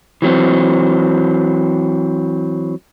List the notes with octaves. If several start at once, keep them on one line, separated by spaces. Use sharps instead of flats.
E3 F#3 C4